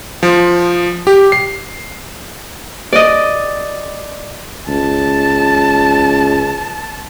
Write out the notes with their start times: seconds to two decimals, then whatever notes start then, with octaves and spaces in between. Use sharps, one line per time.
0.23 F3
1.07 G4
1.32 C7
2.93 D5 D#5
4.69 C#2 A5